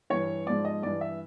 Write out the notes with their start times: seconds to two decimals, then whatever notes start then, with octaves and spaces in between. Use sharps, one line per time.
0.10 G2 E3 C#5
0.46 G#2 F3 D5
0.65 D#5
0.82 G2 E3 D5
1.01 E5